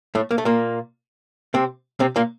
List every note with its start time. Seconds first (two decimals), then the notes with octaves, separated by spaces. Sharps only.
0.15 A2 A3
0.31 A#3
0.38 A3
0.45 A#2 A#3
1.54 C3 C4
2.00 C3 C4
2.16 A#2 A#3